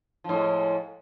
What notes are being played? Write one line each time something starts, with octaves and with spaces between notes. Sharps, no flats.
A2 F3 G#3